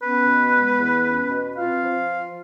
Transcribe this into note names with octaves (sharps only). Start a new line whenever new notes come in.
B3 C#4 B4
B2
G#3
E2
C#4
B2
C4 F4 F5
F3